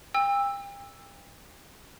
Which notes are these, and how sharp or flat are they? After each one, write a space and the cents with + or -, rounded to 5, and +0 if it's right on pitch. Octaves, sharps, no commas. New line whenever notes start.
G5 +35 E6 +0